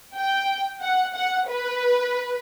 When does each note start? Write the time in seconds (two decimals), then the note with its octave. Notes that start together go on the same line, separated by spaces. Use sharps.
0.15 G5
0.81 F#5
1.15 F#5
1.48 B4